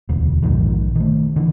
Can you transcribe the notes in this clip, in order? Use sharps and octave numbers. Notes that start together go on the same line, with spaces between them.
E1 D2
A#1 G#2 D#3 F3
D#3 A3
D3 E3